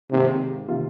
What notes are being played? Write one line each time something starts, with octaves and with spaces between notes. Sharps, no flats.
G#2 C3 D#3 A#3
C3 D#3 A#3 F4